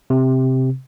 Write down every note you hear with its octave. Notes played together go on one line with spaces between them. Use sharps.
C3